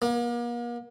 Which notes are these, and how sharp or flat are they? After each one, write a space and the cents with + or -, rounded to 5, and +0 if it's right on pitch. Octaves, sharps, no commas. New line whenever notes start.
A#3 +40